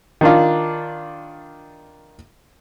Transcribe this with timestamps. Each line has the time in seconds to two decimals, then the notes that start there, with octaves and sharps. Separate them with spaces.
0.21 D#3 D4 F4